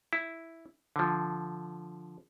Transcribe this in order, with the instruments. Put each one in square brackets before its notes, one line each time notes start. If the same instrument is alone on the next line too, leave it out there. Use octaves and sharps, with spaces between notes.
[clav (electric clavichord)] E4
D3 F3